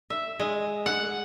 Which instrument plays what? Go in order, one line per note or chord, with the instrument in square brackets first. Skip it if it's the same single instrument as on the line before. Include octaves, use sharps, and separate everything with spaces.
[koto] E5
G#3
F#5